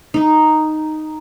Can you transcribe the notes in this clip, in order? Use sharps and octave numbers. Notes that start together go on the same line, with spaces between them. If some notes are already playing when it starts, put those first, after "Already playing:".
D#4